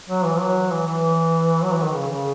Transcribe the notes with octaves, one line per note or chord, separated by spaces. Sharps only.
F#3
E3
F#3
E3
E3
F#3
E3
D#3
C#3
C#3